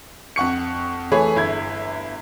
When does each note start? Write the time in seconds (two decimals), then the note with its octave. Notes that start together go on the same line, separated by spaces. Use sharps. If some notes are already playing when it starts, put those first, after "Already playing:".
0.36 F2 F#5 C#6 C#7
1.12 E3 A3 G#4 C#5 B5
1.36 G1 E4 G#6